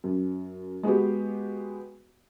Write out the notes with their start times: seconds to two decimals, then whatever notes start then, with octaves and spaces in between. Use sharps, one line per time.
0.04 F#2
0.83 G#3 B3 F#4 G4